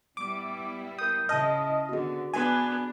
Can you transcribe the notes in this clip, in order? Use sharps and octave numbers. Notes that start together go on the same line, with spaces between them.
G3 B3 E4 D6
A#4 D#6 G6
C#3 E4 D#5 A5 D#6 F6
D3 B3 F#4 G#4
B3 D4 B4 G#5